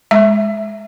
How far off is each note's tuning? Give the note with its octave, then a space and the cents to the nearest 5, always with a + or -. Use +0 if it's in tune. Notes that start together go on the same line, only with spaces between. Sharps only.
G#3 +0 E5 +0